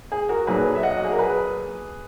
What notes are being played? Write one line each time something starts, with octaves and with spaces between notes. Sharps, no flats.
G#4
F#4 A#4
B1 A#2 F#3 G#4 B4
E5
D#5 F#5
F#4
G#4
A#4
G#4 B4